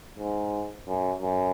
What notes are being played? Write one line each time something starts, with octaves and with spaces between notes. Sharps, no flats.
G#2
F#2
F#2